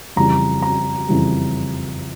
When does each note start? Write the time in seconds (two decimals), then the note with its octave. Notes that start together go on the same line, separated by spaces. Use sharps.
0.16 F2 C#3 E3 G3 A#5
0.62 A#5
1.08 F2 C#3 E3 G3